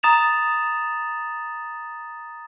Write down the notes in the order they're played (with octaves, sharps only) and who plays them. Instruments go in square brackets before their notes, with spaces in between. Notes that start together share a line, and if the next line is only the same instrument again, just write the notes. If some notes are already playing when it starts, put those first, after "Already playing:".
[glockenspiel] A#5 D#6 A6 E7 F7